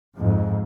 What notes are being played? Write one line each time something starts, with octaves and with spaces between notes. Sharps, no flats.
F2 G#2